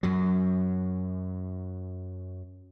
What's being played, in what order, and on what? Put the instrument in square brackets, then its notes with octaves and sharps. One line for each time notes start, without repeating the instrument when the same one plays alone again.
[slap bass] F#2 F#3